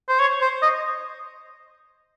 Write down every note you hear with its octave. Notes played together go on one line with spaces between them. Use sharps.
C5
C#5
C5
D#5